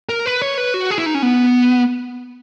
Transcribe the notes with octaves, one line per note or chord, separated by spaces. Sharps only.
A#4
B4
C#5
B4
F#4
G#4
E4
D#4
C#4
B3